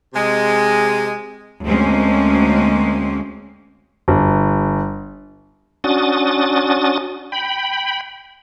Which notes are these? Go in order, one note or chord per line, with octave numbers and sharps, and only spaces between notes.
C3 G#3
D2 G#3 A#3 C4 C#4
G1
C#4 D4 F#4 D#6 A6
G5 B5